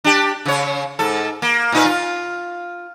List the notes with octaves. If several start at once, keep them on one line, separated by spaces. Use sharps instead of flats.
D4 G4
C#3 C#5
G#2 A4
A#3
A#2 D#4 B4
F4